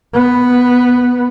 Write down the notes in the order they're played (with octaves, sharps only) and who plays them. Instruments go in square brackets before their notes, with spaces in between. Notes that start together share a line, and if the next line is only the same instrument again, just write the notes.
[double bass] B3